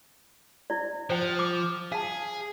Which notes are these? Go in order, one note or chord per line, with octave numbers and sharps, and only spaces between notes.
E4 D5
F3 C5 G5
D6
G#4 F5 A5